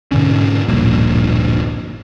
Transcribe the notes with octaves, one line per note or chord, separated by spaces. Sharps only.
G#2 B2 D3 C#4
D1 A#1 G2 A#3